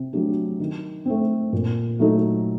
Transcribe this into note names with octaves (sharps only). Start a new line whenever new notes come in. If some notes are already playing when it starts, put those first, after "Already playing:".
Already playing: C3
F#3 A3 D4 G4
D#3
A3 C4
A#2
F#3 A3 D#4 A4